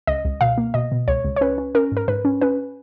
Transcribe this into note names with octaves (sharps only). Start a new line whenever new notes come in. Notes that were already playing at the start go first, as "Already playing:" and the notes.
C#2 D#5
C#2
B2 F5
A#3
B2 D#5
B2
C#2 C#5
C#2
C#5
C#4 B4
C#4
C#4 A#4
G#2 A#4
G#2 B4
C#4
C#4 B4